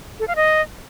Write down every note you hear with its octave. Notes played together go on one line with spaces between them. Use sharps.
A4
F5
D#5